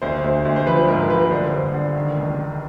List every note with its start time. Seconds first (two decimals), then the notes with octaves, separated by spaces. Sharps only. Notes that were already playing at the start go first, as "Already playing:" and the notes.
0.02 D2 C5
0.24 D2
0.45 D2
0.56 C5
0.66 F3 B4
0.88 G#2 A#4
1.09 F3 B4
1.31 D3 C5
1.52 G2
1.74 D3
1.95 D#3
2.17 C#2
2.39 D#3